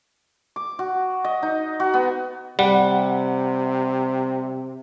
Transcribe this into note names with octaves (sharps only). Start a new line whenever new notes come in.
D6
F#4
D#5
D#4
F#4
B3
C3 G3 F#5